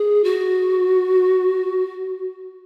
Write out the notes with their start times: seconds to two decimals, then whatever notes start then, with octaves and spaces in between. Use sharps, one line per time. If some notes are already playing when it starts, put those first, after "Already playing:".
Already playing: G#4
0.24 F#4